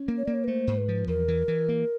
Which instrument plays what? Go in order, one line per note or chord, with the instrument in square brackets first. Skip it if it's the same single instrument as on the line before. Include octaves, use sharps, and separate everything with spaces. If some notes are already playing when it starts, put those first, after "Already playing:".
Already playing: [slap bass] C#4
A#3
[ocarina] C#5
[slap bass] A#3 [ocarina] D5
[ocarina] C#5
B4
[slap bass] A3 [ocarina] C5
[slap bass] G#2
[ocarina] B4
[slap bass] F3
[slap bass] E2 [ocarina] A#4
[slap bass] E3
E3
A#3